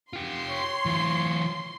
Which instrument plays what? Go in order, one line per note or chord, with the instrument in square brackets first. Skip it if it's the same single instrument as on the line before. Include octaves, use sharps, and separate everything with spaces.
[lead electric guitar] F4 G4 [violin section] C6
[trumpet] C#5
[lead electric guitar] E3 F4